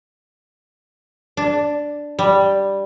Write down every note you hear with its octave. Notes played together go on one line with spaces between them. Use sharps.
D4
G3